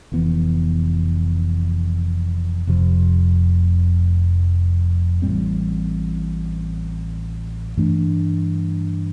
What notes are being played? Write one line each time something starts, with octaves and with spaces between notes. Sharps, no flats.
F1 F2 E3 B3
F1 F2 C3 F3
A1 A2 G3 C4
G2 E3 A3 D4